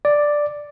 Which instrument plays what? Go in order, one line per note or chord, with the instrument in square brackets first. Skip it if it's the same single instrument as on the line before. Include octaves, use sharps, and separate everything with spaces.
[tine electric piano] D5